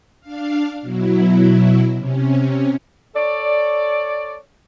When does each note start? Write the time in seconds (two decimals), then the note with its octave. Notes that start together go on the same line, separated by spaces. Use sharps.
0.21 D4 F5
0.82 B2 F#3 E4
1.95 C3 C#4
3.15 A4 C#5 D5